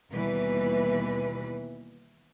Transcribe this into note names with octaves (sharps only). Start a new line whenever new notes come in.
D#2 B2 E3 G3 B4